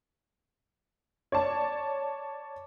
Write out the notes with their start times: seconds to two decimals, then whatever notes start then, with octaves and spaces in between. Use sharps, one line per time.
1.32 C#5 D5 A5